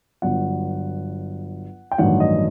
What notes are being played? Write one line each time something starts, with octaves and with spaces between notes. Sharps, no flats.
G1 G2 F#3 F#5
G5
A1 G2 D#3 F#3 F#5
D#5